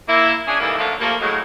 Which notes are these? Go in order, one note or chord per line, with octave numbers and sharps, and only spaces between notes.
A#3 E4
C#4 D4 G#4
D#3 E3 G3 A3 A#3 E4
D3 F3 F#3 A3 A#3 F4
F3 G3 A3 A#3
A2 F#3 G#3